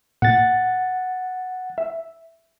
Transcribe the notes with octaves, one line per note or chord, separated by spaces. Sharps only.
A#2 F#5 A6
E5